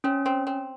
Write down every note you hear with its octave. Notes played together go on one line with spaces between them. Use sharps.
C4 C#4
C4
C4